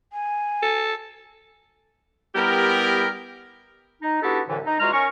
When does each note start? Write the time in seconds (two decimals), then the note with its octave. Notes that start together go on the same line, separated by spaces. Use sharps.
0.13 G#5
0.62 A4
2.35 G3 B3 E4 G4 A#4
4.02 D#4
4.22 B3 D4 E4 F#4 G4 A4
4.48 C2 A2 D3 E3
4.65 D#4
4.80 E2 G#3 F4 F#4 A#5 F6
4.93 C#4 A#4 C#6